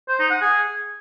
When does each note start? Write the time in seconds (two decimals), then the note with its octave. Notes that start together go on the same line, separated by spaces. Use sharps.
0.09 C5
0.19 D#4
0.30 F#5
0.41 G#4